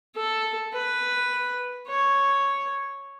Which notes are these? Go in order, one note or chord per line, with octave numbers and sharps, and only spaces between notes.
A4
B4
C#5